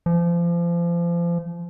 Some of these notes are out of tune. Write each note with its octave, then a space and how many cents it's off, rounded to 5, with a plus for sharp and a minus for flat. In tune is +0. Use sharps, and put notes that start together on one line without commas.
F3 -30